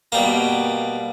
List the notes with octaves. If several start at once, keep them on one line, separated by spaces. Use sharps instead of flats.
B2 G3 A#3 A#5